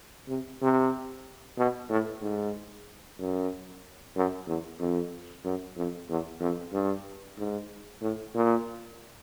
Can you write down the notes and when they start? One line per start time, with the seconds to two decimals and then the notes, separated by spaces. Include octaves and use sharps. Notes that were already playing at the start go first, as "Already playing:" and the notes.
0.29 C3
0.62 C3
1.58 B2
1.90 A2
2.22 G#2
3.19 F#2
4.16 F#2
4.47 E2
4.80 F2
5.45 F#2
5.77 F2
6.09 E2
6.41 F2
6.73 G2
7.38 G#2
8.02 A2
8.35 A#2